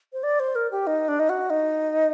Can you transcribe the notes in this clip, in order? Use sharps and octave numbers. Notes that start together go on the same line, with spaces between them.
C5
D5
C5
A#4
G4
D#4
D4
D#4
F#4
D#4